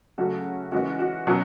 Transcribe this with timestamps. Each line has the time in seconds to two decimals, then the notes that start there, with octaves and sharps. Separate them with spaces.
0.18 C#3 F#3 A3 C#4 F#4
0.72 E3 G#3 C#4 F#4
0.99 F#4
1.27 B2 F#3 C#4 F#4